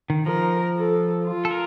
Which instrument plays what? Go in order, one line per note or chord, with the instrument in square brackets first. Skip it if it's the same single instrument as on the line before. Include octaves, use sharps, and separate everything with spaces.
[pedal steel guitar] D#3
[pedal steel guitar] F3 [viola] A#4
[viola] A4
F4
[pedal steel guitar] A4
A#4